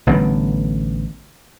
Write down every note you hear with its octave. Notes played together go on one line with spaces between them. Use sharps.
A1 D3 G3 B3